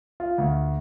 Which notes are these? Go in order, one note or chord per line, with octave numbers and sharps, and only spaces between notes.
F4
D2